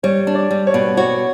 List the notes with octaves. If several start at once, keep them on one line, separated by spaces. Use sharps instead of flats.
G3 C#5
D4
D5
G3
C#5
B2
F#4 C#5